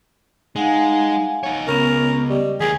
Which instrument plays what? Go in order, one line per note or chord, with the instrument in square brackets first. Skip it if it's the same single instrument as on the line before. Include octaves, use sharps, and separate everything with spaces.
[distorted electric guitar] G#3 [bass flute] D#4 [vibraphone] F5 F#5 G#5
[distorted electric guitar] D#4 C#5
[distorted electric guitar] C#2 [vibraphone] B3 C#6 [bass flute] C#4 [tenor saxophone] A#4
[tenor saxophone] G3 [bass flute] D#5
[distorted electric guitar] D#2 A#3 [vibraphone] F#3 [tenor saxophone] G#4